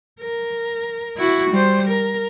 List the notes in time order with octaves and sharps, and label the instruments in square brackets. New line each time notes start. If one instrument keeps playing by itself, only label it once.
[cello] A#4
E4 F#4
G3 C5
A#4